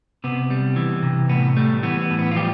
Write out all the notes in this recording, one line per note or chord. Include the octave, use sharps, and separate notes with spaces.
C3 B3
G3
E3
C3
A2 B3
G3 A3
E3 B3
B3
A2
B3
F4
F3 G3 G4